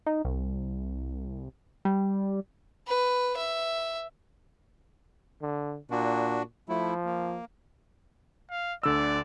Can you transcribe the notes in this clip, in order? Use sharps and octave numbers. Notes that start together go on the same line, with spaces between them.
D#4
C2
G3
B4
E5
D3
A#2 D4 F#4
F3 A3 E4
A#3
F5
D2 D3 D5 E6